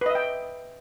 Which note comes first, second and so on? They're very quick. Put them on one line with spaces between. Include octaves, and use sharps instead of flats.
B4 D#5 E5 G5